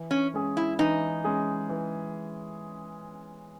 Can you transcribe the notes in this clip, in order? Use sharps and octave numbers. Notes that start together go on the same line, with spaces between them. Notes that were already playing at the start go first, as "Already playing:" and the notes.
Already playing: E3
C#4
G#3 C#4 G#4
E4
E3 D#4
G#3 C#4 G#4
E3